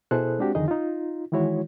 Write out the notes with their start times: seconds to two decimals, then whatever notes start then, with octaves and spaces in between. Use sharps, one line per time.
0.11 B2 E4 G#4 A4 C5 F#6
0.39 G#3 C4 D4 F#4 G4
0.55 F2 D3 D#3 D#4 G#4 D#5
0.68 D#4 F4
1.32 D#3 E3 G#3 E4 F#4 C#5